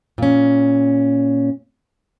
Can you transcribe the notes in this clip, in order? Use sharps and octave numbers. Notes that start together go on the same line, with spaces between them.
A#2 C#4